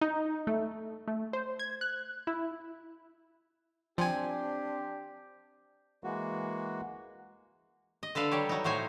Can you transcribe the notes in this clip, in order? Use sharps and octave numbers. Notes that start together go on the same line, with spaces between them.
D#4
A3
A3
C5
G#6
F#6
E4
F3 C4 D4 G4 G#5
E3 G#3 A#3 F#4
D#5
D3 A4 B4 F5
F#3 G3 G4 C#5
F#3 D#4
A2 F#3 C5 C#5 G#5